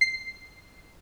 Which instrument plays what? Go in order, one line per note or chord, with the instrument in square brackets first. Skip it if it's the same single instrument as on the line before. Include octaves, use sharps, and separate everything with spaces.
[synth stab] C7